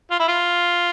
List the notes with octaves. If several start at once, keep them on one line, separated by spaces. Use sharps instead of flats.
F4
E4
F4